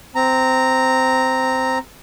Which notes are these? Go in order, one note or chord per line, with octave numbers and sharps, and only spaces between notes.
C4 A#5